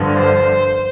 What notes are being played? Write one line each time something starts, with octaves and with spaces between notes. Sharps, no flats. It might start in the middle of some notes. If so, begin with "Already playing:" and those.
Already playing: G2 D3 F3
C5